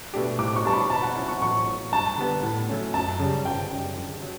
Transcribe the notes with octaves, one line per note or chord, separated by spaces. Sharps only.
B2 A3 D4 G4
A2 D6
C#6
G3 B3 D4 F#4 A5
B5
B2 A5
F#5
F#3 C#4 E4
C#6
A1 C#6
A2 F#3
G2 A5
D3 G3 B3
A2
F#3 A3 C#4
F#2 A5
C#3 G3
G1 G5
F#2 C#3 G3
D3
F#3